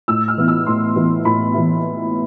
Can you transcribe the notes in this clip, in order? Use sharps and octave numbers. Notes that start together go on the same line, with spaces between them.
A2 E6
F6
E3 B3 E4
E6
A2 C6
E3 B3 E4
A2 B5
E3 B3 E4